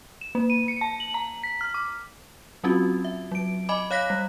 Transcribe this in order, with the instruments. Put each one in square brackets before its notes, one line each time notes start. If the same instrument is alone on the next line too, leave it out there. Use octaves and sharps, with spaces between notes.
[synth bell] E7
A#3
D#7
C#7
A5
F#7
A#5
B6
F6
D6
F#3 C4 C#4 F4 F#4
E5
F#3 D7
D#5 G#5 B5 D6
C#5 F5 F#6 A#6 B6
G3